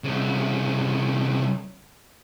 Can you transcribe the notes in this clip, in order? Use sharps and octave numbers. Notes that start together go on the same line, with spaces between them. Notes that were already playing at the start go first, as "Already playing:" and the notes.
C2 C#3